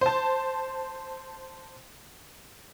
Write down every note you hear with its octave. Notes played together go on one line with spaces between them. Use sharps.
C5 A5